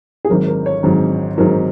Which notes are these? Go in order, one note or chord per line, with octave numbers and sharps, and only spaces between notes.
G#4
G#1 G#2 F#3 A#4
A#4
C#5
G#1 G#2 F#3
G#1 G#2 F#3 A#4